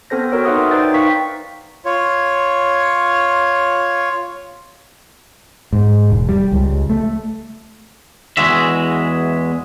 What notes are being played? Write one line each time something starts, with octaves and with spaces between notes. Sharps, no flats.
B3 C4 A4 C5 A#6
F#4 A4 A#4 C#5 G5
D#4 B4 E5 F#5 C6 D#6
D#4 B4 C5 D5 G5 A6
D#4 A#4 B4 F5 C#6 B6
F4 C#5
G#2
E1
G3
C#2
A3
E2 C3 E3 G#3 F#4 E5